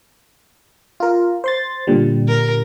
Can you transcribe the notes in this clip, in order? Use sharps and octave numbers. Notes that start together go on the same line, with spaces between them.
F4 A#4
C5 C6 A6
A#2 D3 G3
A#4